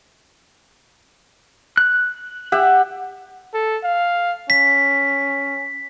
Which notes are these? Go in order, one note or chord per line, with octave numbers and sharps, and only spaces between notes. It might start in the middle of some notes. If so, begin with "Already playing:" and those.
F#6
G4 E5 F#5
A4
F5
C#4 B6